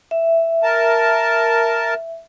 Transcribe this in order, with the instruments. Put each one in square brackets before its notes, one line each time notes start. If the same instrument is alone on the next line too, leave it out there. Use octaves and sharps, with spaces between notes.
[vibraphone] E5
[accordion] A#4 A5